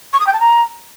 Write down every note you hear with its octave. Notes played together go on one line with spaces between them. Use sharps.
C#6
D#6
G5
A5
A#5